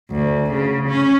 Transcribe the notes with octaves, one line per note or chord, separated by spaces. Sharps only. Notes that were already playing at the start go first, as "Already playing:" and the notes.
D2
C#3
C#4